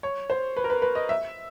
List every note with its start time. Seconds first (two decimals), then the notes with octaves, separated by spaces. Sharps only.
0.03 C#5
0.30 C5
0.57 B4
0.64 A#4
0.70 B4
0.82 B4
0.95 D#5
1.09 E5